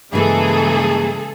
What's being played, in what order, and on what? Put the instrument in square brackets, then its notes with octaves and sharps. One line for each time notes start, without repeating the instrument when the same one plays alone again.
[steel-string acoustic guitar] G2 A#3 [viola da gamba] C#3 G#3 [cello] E3 [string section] G#4 A4